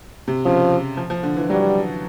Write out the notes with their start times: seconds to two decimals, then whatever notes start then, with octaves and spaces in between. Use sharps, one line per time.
0.28 C3
0.45 C#3 F3
0.97 F3
1.10 F3
1.23 D3
1.36 E3
1.49 F#3 G3